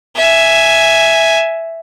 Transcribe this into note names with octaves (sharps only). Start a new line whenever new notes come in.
E5 G#5